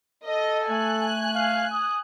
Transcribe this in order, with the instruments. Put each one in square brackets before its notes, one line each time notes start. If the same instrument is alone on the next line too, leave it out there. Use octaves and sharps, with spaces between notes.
[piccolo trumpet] A4 [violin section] D#5
[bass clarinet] A3 [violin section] G#5 F#6
[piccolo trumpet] F5
D#6